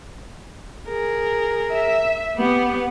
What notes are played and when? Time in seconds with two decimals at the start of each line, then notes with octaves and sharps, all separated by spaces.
0.88 G#4 A#4
1.73 E5
2.38 B3 G4